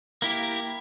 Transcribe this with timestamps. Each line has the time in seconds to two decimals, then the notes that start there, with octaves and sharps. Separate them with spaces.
0.22 A#3 E4 G4